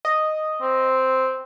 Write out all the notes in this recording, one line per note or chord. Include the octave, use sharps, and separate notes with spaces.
D#5
C4